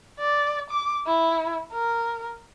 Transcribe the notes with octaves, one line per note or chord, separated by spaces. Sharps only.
D5
D6
E4
A#4